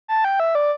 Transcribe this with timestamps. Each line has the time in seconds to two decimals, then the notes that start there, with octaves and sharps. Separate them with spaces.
0.08 A5
0.24 G5
0.40 E5
0.55 D5